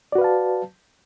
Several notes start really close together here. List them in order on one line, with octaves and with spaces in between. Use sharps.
D5 F#4 B4 F5 A5